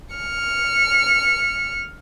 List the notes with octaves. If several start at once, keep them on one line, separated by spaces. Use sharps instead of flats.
F6 C#7